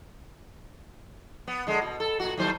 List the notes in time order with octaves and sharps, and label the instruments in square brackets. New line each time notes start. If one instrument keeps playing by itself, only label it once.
[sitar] B3
D3 G#3
B2
A4
A#2 F#4
D#2 F#3 C5